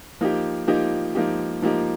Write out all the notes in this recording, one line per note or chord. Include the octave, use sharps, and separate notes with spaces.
F3 A#3 D#4 G4
F3 A#3 D#4 G4
F3 A#3 D#4 G4
F3 A#3 D#4 G4